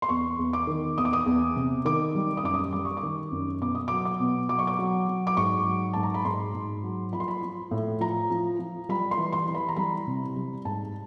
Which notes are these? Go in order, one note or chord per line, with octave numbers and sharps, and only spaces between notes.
C6
E2 C#6
E2
D6
D#3
E2 D#6
D6
D#6
E2
C3
D#3 D6
G3
D#6
F#2 D6
D#6
G3 D6
C#6
D6
D#3
F#2
B2 D6
D#6
F#3 D6
D6
B2
F#3 D6
C#6
D6
F#3
F#3
D6
G#2 C#6
F#3
G#2 A5
A#5
B5
G#2 C6
G#2
F#3
F3 B5
C6
B5
F3
A2
F3 A#5
F3
F3
G3 B5
C6
E3
C6
E3
B5
A#5
G3 B5
C3
G3
G#2 A5